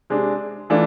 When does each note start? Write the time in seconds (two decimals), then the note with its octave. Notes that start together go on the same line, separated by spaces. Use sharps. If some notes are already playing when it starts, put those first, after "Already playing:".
0.10 C3 G#3 D4
0.70 E3 A3 D4 F4